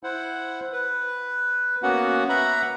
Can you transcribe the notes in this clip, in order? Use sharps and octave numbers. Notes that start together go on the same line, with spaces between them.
E4 C5 F#5
B4
A#3 B3 C#4 F#4 F#5
B4 E5 F#5 A#5 B5